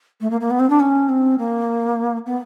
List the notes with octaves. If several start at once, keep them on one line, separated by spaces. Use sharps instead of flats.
A3
A#3
A#3
B3
C4
D4
C#4
C4
A#3
B3